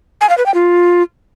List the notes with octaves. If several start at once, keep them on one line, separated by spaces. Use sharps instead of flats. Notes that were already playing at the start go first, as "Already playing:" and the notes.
G#5
F5
B4
G5
F4